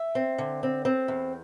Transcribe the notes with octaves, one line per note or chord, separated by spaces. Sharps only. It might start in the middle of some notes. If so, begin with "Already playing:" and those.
Already playing: E5
C4
D3
C4
C4
E2